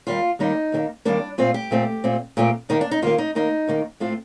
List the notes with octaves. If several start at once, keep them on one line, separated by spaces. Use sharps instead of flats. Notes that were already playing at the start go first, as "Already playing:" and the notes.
D#2 D#3 G3 A#3 F4
D#2 D#3 G3 A#3 D#4
D#2 D#3 G3 A#3
D#2 D#3 G3 A#3 D4
A#2 A3 C4 F4
G4
A#2 A3 C4
A#2 A3 C4
A#2 A3 C4 G4
D#2 D#3 A#3 D#4
D4
D#4
D#2 D#3 A#3 F4
D#4
D#2 D#3 A#3 D#4
D#2 D#3 A#3
A2 A3 C4 F4